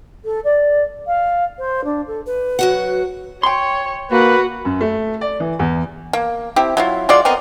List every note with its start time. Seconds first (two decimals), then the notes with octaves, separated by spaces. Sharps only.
0.24 A4
0.44 D5
1.07 F5
1.58 C5
1.84 D4
2.07 A4
2.26 B4
2.59 F#3 F#4 F#5
3.43 C#5 G5 C6
4.12 A#3 F#4 B4
4.65 F#2
4.81 A3
5.21 D5
5.40 E3
5.59 E2
6.13 A#3
6.56 C4 E4 G4
6.77 F#3 E4 F4
7.09 G#3 F4 F#4 D5
7.25 B3 C4 A#4 D#5